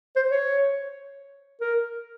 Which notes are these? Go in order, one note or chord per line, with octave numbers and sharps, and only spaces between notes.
C5
C#5
A#4